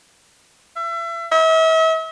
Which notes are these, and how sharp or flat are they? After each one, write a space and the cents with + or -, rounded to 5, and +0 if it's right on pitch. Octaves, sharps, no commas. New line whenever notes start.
E5 +35
E5 -40